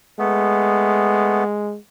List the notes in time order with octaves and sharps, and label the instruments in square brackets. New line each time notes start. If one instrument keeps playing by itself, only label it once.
[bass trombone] G#3 [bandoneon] A3 B3